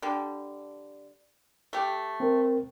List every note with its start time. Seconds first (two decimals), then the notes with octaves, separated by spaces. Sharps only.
0.02 D3 G3
1.73 A3 G4
2.20 C4 A#4